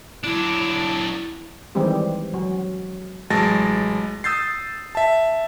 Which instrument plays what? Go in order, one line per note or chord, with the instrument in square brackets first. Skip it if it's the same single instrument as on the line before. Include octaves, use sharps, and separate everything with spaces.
[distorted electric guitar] F#3 D4 [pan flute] E4
[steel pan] D#3 E3 G3 G#3 C4 G4
F#3
[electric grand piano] A1 F#3 G#3 A5 A6 A#6
D#6 E6 G6 A6 C7
E5 A5